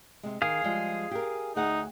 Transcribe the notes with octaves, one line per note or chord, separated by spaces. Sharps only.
C3 G#3
D#3 G#4 F5
F3 G3 G#3
G4 A#4
D2 D#4 G#4 F#5